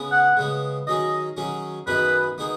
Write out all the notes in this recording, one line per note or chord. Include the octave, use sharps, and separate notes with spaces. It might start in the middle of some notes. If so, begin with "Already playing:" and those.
Already playing: C#3 G#3 B3
F#5
C#3 G#3 B3
D#3 F#3 C#4 G#4 D#5
D#3 F#3 C#4 G#4
F#2 D#3 B3 D#4 G#4 B4
D#3 B3 D#4 G#4